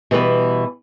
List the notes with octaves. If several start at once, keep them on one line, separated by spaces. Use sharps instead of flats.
B2 E3 G3 B3 B4